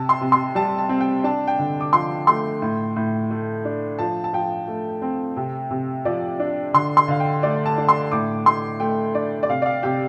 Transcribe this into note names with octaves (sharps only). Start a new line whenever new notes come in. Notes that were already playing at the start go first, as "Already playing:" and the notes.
Already playing: C3 A5
C6
C3
C6
G3 A5
A5
C4
G5
D4 A5
G5
D3
D6
F3 C6
A3 C6
A2
A2
A3
D4
F3 A5
A5
F3 G5
A3
C4
C3
C3
F3 D5
D4
D3 C6
C6
D3 F5
G5
A3 D5
A5
D4
C6
A2 D6
A2 C6
A3 G5
D4 D5
D5
C3 F5
D5
F5
C3 G4